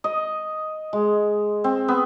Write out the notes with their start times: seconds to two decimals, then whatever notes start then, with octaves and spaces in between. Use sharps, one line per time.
0.04 D#5
0.93 G#3
1.64 C4
1.88 B3